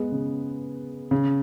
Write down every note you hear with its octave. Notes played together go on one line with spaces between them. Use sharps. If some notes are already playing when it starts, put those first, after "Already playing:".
Already playing: G#3 B3
C#3
C#3